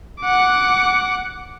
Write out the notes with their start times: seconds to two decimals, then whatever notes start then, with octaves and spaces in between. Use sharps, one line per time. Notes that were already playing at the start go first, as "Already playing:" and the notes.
0.22 F#5 D6